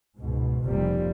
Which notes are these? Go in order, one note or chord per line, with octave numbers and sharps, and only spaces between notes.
C#2 G#2 B2
F1 C2 C3 F3 G3 A#3